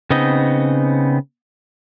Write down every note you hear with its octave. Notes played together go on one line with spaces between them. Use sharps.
C#3 B3 C4 D#4 D#5